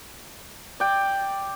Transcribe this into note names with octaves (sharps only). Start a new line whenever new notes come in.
D5 G5